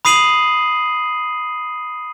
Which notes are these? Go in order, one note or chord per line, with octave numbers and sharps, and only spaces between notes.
B5 D#6 C7 D#7 F#7